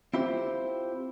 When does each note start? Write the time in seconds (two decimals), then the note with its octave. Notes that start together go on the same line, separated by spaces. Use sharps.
0.14 C4 E4 F4 G4 C5